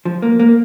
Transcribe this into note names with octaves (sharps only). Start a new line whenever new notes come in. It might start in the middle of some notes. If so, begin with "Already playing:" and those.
F3
A#3
A#3